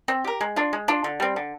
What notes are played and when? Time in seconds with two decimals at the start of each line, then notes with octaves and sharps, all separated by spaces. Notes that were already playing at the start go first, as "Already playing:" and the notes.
0.08 C4
0.24 G4 A#4
0.41 G#3
0.56 D4 F4
0.73 G#3
0.88 D4 F4
1.04 D3
1.20 G3 C4
1.36 D3